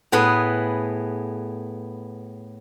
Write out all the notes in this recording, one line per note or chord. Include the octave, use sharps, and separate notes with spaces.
A2 B3 G#4 B4 B5